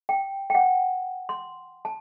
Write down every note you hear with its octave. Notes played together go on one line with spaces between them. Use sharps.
G5
G5
F#5
C6
A5